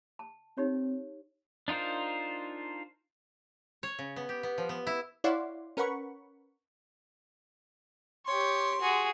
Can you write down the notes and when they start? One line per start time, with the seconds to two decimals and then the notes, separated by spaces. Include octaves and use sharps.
0.19 A5
0.57 C4 D#4 G4 C#5
1.68 D4 D#4 F4 A#4 C5
3.83 C#5
3.99 C#3
4.16 B3
4.29 G4
4.43 B3
4.58 F3
4.69 B3
4.87 E4
5.24 E4 C#5 D5 F5 F#5 C6
5.77 C#4 A#4 B4 F#5 B5 C#6
8.26 G4 C#5 C6
8.81 F#4 G#4